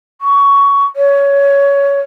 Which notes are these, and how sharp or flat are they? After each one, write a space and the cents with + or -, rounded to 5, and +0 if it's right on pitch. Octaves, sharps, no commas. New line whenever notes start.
C#6 +15
C#5 +15